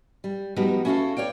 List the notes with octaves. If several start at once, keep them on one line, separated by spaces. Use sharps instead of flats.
G3
F3 G3 B3 D#4 F#4 G4
C#4 E4 F#4 G4 A4 F5
C#5 D5 F5 G5